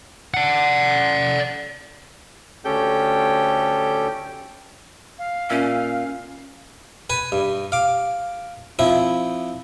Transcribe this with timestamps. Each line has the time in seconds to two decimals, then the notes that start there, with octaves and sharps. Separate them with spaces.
0.34 D5 F#5
2.65 D2 C#4 G4 A4 G5 G6
5.18 F5
5.50 A#2 C#4 E5
7.10 B4 G#5
7.32 G2
7.72 F5 D6
8.79 F3 C4 E4